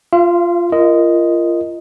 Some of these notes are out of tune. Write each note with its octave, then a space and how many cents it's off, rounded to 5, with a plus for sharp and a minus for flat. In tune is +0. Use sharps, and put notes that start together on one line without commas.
F4 -10 F5 -45
F4 -30 A#4 +0 D#5 +0